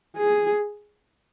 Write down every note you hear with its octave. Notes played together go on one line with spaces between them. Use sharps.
G#4